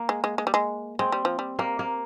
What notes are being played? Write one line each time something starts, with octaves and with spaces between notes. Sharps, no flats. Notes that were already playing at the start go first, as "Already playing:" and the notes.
Already playing: A#3
G#3
G#3
G#3
G3
G#3
G#3 C4
G3
F3
G3
G3 A#3
A#3